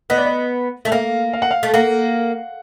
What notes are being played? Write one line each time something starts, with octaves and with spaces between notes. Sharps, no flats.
B3 D#5
D5
D#5
A3 E5
A#3 F5
F5
F#5
F5
A3
A#3 F#5